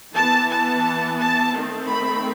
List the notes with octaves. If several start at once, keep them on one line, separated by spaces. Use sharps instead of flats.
E3 B3 A5
A5
A5
D#3 A3 C4
B5